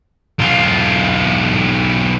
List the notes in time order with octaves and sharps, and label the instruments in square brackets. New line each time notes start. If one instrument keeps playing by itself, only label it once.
[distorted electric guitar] B1 F4